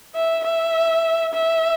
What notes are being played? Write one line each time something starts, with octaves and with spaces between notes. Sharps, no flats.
E5
E5
E5